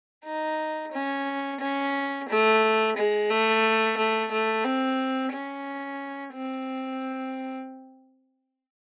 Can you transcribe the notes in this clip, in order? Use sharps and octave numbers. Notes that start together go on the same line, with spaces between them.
D#4
C#4
C#4
A3
G#3
A3
A3
A3
C4
C#4
C4